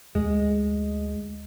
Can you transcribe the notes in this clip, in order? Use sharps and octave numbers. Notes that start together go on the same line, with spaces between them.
D2 G#3